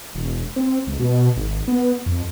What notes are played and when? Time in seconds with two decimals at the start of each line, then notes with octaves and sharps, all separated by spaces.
0.15 E1
0.56 C4
0.87 C#2
0.99 B2
1.37 G#1
1.68 B3
2.06 F2